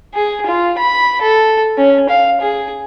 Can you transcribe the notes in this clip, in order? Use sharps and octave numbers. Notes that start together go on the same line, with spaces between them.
G#4
F4
B5
A4
C#4
F5
G#4